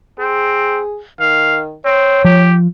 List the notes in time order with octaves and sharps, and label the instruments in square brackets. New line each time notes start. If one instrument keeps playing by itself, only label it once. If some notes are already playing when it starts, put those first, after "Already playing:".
[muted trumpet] C4 [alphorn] G#4
[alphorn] D#3 [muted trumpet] F5
[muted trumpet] C4 [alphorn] C#5
[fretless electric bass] F3 [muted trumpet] G4